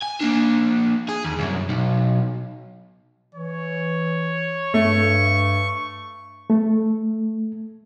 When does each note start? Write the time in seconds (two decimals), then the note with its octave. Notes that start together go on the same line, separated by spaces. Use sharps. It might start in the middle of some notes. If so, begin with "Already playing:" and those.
0.02 G#5
0.21 A#3 D4
1.09 G#4
1.24 D#2
1.39 C2 F#2
1.69 B1
3.35 E3 C#5
4.74 G2 A3 C#6
6.50 A3